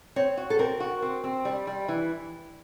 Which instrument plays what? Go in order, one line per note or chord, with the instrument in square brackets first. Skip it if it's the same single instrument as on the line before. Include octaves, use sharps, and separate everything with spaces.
[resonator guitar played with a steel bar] C4 [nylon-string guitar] C#5
[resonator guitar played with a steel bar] F#4
[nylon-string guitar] A4
[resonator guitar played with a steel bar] C4 [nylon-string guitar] A#4
[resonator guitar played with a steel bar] F#4
C4
C4
G3
G3
E3